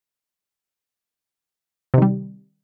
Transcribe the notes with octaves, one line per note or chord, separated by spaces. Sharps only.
C3 D#3 G3